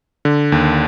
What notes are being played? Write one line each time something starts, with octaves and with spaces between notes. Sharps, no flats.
D3
D#2